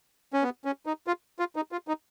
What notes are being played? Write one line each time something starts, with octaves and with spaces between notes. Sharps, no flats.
C#4
B3
C#4
D#4
F4
F4
D#4
F4
D#4